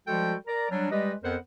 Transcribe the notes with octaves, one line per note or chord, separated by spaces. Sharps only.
F3 G3 G#3 F#4 A4 G5
A#4 D5 A#5
F#3 G3 D4
G3 G#3 G4 B4 D#5
F2 B3 A#4 C5 F#5